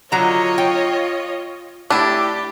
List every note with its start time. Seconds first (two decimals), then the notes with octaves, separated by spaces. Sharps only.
0.12 D3 F#3 F4 C#5 D#5 A#5
0.58 G5
1.90 A3 D4 E4 G4